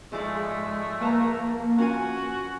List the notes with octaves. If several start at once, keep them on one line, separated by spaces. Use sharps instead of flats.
G#2 F3 G#3 A3 D5
A#3 B4 A5 A#5
C#4 F4 F#4 G#5